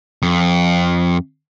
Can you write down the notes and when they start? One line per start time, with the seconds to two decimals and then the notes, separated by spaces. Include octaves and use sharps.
0.23 F2